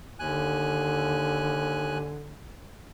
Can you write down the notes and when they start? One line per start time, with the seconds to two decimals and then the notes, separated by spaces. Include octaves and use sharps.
0.19 D#2 D3 G#5 F#6